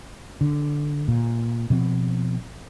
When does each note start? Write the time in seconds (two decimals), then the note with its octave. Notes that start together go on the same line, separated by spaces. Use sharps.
0.41 D3
1.08 A#2
1.70 B2 F3 C4